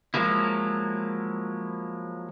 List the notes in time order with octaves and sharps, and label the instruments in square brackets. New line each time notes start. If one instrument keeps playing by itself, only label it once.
[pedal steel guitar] F3 F#3 G#3 A#3 E4